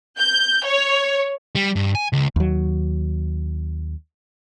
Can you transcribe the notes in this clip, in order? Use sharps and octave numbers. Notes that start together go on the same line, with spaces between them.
G6
C#5
G3
G2
G#5
C#2
D#2 F#3